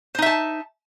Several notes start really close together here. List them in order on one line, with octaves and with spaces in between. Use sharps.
C5 D#4 E5 A5